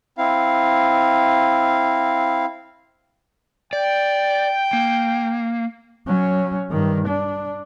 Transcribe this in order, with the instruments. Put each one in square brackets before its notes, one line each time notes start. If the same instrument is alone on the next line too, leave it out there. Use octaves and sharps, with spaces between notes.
[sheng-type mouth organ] C4 E4 F5
[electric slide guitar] D5 [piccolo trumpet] G5
[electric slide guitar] A#3
[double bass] F#3 C#4
G2 D#3
D4